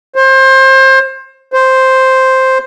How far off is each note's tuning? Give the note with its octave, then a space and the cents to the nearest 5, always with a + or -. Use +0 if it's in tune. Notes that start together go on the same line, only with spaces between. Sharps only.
C5 +25
C5 +0